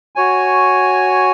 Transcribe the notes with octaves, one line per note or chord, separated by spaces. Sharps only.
F#4 C#5 G#5